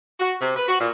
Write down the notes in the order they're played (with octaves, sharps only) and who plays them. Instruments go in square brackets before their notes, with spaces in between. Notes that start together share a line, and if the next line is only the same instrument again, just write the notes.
[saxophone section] F#4
C3
B4
F#4
A#2